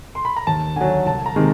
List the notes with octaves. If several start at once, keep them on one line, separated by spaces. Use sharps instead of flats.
C6
B5
A#5
D#2 A5
D3 F#3 G#5
C2 A5
A#5
C3 D#3 G#3